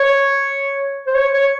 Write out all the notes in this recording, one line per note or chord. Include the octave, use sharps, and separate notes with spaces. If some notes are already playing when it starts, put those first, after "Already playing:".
Already playing: C#5
C5
C#5
C#5